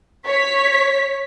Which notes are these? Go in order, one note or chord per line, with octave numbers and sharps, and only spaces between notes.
C#5 B6